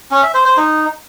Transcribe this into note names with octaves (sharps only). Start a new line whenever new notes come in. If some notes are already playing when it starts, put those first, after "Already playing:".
C#4
E5
C5
C5
D#4